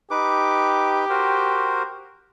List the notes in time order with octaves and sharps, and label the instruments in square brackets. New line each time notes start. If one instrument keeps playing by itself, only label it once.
[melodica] D#4 B4 D6 [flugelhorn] G4
[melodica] F#4 A#4 C5